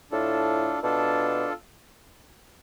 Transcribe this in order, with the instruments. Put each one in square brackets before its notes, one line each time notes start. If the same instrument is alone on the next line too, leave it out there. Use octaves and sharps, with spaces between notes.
[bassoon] A2 [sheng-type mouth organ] D4 F4 A4
[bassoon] B2 [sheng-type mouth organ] D4 F4 A4